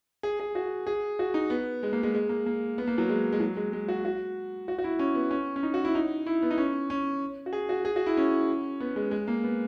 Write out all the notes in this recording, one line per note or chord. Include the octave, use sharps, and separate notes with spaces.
G#4
G#4
F#4
G#4
F#4
D#4
B3
G#3
A#3
G#3
G#3
A#3
A#3
B3
A#3
F#3
G#3
G#3
F#3
G#3
G#3
F#4
F#4
F#4
F#4
E4
C#4
B3
C#4
C#4
D#4
F#4
E4
D#4
E4
B3
D#4
C#4
C#4
F#4
G#4
F#4
G#4
F#4
E4
C#4
B3
G#3
G#3
A#3
B3